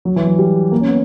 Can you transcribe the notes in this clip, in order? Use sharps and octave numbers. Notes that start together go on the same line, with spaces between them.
F#3
E3
F#3
G3
A#3
C#4
B3